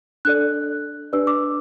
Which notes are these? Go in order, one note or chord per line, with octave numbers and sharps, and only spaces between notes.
D4 A4 D5 F#6
D4 G4 B4 D5 E6
D6